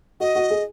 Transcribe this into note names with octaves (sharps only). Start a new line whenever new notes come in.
F#4 D#5
F#4
G#4